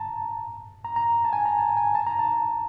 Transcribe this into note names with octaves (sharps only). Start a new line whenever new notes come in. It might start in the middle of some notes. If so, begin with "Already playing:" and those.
Already playing: A5 A#5
A#5
A#5
A5
G#5
A#5
A5
G#5
A5
A#5
A5